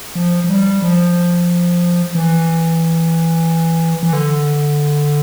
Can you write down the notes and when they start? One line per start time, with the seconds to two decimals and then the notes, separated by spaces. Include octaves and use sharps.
0.15 F3
0.44 F3
0.49 G3
0.82 F3
2.15 E3
4.03 E3
4.13 D3